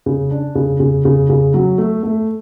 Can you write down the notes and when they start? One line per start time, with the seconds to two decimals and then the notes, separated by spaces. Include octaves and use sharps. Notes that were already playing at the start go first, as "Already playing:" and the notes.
0.06 C#3
0.31 D4
0.55 C#3
0.80 C#3
1.05 C#3
1.30 C#3
1.54 F#3
1.78 A3
2.03 A3